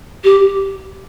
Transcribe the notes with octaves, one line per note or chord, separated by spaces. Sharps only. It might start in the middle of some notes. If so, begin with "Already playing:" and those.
G4